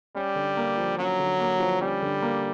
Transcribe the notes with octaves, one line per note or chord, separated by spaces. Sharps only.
G3 C#4
D3
A#3
F3
F#3 C#4
D3
A#3
F3
G3 C#4
D3
A#3